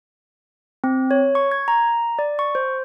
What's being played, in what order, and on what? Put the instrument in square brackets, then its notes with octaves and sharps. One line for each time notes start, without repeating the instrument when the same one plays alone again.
[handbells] C4
C#5
C#6
G#6
A#5
D5
C#6
C5